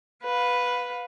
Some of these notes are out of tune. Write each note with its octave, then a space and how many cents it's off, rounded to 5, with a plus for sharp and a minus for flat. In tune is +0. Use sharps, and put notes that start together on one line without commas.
B4 +0 F5 +30